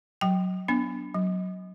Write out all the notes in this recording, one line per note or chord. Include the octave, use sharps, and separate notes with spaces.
F#3 G5
B3 D4
F#3